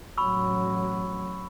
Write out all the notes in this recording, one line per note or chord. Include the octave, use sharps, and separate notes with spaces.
A1 F#3 B5 C#6 E6